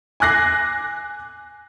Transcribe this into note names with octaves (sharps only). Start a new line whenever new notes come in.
G#5 D6 F#6 A#6 C7